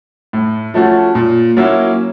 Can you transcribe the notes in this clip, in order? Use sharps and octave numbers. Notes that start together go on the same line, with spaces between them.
A2
F3 A3 C#4 F#4
A#2
F#3 A#3 C#4 E4